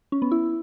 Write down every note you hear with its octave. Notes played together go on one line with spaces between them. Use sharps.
C#4
B3
E4